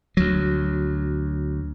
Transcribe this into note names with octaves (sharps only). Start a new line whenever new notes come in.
D2 F#3